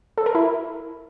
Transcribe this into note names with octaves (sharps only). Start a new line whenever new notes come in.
A4
A#4
E4